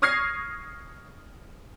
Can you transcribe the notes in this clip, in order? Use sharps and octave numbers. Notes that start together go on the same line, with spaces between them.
C#6 D#6 F6 G#6 A#6 C7